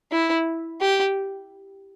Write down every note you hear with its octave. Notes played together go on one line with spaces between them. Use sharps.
E4
G4